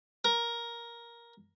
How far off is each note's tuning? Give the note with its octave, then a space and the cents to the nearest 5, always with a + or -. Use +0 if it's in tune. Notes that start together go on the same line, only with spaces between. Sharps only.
A#4 +10